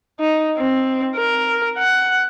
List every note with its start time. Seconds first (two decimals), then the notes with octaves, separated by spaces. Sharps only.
0.20 D#4
0.57 C4
1.16 A#4
1.78 F#5